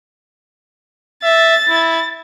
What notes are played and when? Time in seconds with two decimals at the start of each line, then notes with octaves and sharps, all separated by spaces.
1.23 E5 A6
1.69 E4